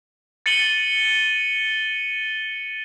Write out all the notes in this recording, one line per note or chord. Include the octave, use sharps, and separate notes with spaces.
A6 C#7 D#7 F#7 G7